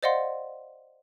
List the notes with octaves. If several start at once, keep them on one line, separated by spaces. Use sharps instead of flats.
C5 D5 D#5 F5 F#5 C6